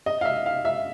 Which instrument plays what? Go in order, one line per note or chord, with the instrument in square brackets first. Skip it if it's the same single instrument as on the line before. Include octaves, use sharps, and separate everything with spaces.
[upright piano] D#5
F5
E5
F5
E5